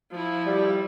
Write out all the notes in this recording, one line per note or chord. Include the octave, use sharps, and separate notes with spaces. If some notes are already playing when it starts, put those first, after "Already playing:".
F3 E4
G3